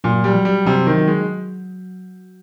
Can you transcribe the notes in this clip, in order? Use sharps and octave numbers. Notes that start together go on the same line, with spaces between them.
A#2 F#3
G3
F#3
G3
C3 F#3
D#3
F#3
G#3